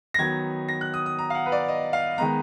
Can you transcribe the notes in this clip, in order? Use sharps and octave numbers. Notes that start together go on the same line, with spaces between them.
A#6
D#3 F#3 B3 G#6
A#6
F#6
D#6
D#6
A#5
F5
F#5
B4
D5
D#5
F5
D#3 G#3 B3 A#5